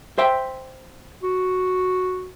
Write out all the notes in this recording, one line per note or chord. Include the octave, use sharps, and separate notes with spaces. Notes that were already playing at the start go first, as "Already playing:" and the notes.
C5 E5 G5
F#4